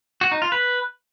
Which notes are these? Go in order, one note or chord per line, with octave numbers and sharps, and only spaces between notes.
F#4
D#4
F4
B4